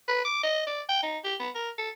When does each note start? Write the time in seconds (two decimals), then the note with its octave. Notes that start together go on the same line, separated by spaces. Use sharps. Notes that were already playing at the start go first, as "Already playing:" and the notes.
0.09 B4
0.25 D6
0.44 D#5
0.67 D5
0.89 G5
1.03 D#4
1.25 G4
1.40 B3
1.55 A#4
1.78 A4